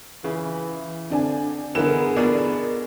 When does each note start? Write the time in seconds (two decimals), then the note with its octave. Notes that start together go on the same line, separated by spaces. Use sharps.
0.24 C#3 E3
1.10 D3 C4 D4 G#5
1.75 D3 E3 G#3 B3 A#4 E7
2.16 B2 D4 G#4